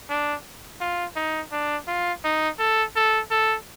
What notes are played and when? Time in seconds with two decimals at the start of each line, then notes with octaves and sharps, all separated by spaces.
0.09 D4
0.80 F4
1.16 D#4
1.52 D4
1.87 F4
2.24 D#4
2.59 A4
2.96 A4
3.31 A4